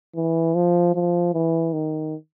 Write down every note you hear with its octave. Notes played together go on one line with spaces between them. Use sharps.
E3
F3
F3
E3
D#3